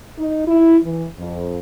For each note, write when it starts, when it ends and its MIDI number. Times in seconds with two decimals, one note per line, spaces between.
0.18 0.44 63
0.48 0.77 64
0.84 1.06 52
1.19 1.59 41